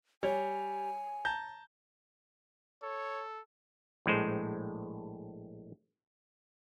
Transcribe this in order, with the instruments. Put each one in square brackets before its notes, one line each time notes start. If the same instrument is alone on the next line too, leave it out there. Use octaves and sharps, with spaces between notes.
[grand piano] G3 [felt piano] C#5 [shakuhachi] G#5
[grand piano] A5 A#5 G6
[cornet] A4 [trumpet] C#5
[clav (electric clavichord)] A#1 A2 G#3 C5